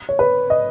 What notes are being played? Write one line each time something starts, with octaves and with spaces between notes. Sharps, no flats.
C#5
B4
D#5